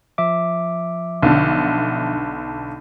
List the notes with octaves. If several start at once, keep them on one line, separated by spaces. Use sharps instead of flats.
F3 E5 D6
B1 D3